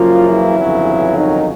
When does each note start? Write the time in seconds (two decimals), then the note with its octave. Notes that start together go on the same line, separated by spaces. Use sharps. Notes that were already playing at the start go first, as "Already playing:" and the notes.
Already playing: F#1 F#2 C#3 F3 A#3 F4
0.28 E3 E4
0.57 G1 F2 C#3 F#3
1.16 D#3 D#4